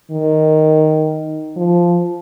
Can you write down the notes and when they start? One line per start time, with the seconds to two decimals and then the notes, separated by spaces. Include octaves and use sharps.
0.11 D#3
1.56 F3